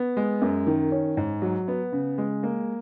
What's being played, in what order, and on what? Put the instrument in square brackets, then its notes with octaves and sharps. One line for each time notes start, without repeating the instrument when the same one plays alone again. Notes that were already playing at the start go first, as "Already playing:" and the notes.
Already playing: [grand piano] B3
G#3
F#2
D#3
C#4
G#2
F#3
B3
C#3
G#3
A#3